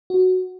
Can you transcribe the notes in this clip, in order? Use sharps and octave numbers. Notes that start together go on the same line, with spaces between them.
F#4